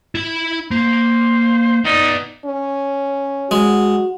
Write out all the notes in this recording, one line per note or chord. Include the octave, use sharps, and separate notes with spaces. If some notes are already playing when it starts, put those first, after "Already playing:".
E4 B5
A#3 C5
B3 D#4 D5
C#4
G#3 F#4